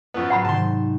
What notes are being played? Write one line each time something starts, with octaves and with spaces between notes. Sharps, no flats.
F#2 F3 B3 B5
G#2 F#3 F#5 A#5 B5
G#2 C3 D#3 A5 C6